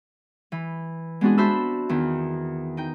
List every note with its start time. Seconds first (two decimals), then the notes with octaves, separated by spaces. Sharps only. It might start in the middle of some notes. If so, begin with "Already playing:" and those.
0.52 E3
1.21 G#3 B3 C4 D4 F#4 G#4
1.38 F#4 C5 E5 A5 B5 E6
1.89 E2 D#3
2.77 D#4 G5